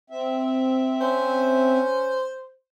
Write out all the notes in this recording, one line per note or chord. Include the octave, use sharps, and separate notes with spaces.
C4 E5
C#4 C5